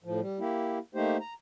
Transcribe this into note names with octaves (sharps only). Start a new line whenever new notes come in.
A2 F3
G3
A#3 E4 G4
A3 A#3 D#4 G4 C5
A#5